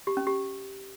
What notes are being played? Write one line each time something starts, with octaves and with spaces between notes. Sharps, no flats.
G4
C#4
G4